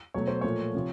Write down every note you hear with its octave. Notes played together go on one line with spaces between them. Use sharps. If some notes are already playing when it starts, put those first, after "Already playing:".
B2 F#3 A3 C#5
C5
A#2 F3 A3 C#5
C3 F3